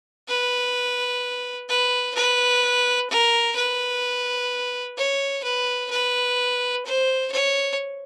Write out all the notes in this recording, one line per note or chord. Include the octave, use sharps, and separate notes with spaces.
B4
B4
B4
A#4
B4
C#5
B4
B4
C5
C#5